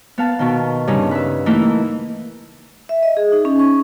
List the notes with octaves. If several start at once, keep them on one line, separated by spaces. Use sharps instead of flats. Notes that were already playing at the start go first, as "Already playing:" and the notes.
B3 F5 A5
B2 D#3
G2 C#3 D#4
B4 E5
E3 A3 A#3 D#4 E4
E5
D#5
G#4
D#4
C#4
C#6